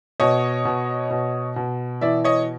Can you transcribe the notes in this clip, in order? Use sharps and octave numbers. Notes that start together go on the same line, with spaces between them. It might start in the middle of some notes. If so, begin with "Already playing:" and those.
B2 C#5 D#5
B2
B2
B2
E3 D5 E5
C#5 D#5